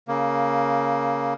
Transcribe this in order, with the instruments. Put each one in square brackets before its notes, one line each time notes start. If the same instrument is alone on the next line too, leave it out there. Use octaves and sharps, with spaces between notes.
[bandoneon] C#3 A#3